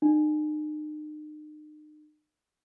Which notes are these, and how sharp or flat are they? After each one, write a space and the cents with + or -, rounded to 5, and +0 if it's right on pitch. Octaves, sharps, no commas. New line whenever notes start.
D#4 -40